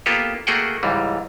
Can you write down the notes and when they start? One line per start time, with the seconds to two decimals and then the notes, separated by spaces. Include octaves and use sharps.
0.06 A#3 B3 F4 G4 A4
0.47 A3 A#3 F#4 G#4 F#5 G5
0.83 C#2 G#2 E3 G3